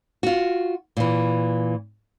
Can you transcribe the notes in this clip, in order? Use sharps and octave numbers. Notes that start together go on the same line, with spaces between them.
F4 F#4
A#2 E3